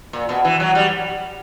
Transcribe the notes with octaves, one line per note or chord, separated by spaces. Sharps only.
A#2
B2
E3
F#3
G3